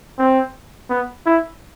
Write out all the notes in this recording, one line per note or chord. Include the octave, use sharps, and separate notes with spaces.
C4
B3
E4